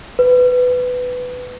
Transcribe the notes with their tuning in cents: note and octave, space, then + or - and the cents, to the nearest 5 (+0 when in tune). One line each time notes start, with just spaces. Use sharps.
B4 +15